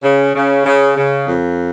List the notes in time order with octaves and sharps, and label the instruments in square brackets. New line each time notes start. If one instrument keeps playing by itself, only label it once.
[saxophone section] C#3
C#3
C#3
C#3
F2